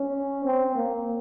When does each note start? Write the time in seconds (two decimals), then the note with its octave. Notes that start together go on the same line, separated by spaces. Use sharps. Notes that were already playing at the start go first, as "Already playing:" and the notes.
Already playing: C#4
0.45 C4
0.75 A#3